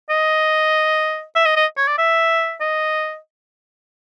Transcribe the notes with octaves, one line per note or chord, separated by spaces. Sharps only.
D#5
E5
D#5
D#5
C#5
D5
E5
D#5